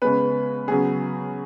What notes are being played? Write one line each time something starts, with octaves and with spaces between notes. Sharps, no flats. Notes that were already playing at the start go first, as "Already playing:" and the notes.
C#3 G#3 B3 B4
C#3 F#3 B3 G#4